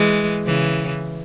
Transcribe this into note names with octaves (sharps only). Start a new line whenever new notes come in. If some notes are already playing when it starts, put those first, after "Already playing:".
Already playing: E3 G#3
C#3 E3